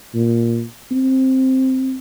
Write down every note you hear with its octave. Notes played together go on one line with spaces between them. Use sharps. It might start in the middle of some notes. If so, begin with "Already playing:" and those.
A#2
C4